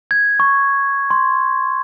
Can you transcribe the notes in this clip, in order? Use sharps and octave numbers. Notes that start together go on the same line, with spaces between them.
G#6
C#6
C6